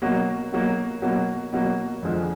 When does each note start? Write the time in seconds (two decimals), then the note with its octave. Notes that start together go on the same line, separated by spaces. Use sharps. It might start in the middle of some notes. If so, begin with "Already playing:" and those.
0.02 B2 F#3 A#3
0.52 B2 F#3 A#3
1.02 B2 F#3 A#3
1.53 B2 F#3 A#3
2.03 F2 D3 F3 G#3